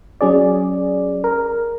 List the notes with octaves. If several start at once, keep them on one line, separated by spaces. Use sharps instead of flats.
F#3 C#4 G#4 D5
A#4